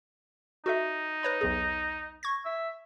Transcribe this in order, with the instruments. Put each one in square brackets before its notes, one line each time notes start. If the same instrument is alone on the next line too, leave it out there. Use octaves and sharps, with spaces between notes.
[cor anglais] D#4 [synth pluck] F#4 A4 E5
[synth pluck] B4 C#5 B5
B1 E2 G#4
C#6 G#6 A#6
[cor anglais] E5